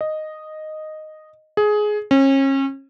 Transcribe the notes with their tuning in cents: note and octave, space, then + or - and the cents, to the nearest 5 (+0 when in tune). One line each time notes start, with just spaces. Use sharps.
D#5 -5
G#4 +15
C#4 -35